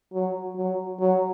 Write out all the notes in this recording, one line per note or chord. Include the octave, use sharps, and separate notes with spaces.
F#3
F#3
F#3